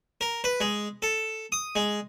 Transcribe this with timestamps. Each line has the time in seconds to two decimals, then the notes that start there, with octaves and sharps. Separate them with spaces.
0.21 A#4
0.44 B4
0.60 G#3
1.02 A4
1.52 D#6
1.76 G#3